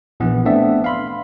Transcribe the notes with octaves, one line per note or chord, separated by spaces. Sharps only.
A#1 E3 B3
A3 B3 C4 D4 D5 E5
F5 B5 C6